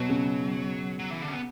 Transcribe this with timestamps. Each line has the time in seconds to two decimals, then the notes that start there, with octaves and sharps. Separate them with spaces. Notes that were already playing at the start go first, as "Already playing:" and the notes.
Already playing: B2 F#3
0.09 C#3
0.99 F#3
1.11 E3
1.22 D3
1.28 C#4
1.33 B3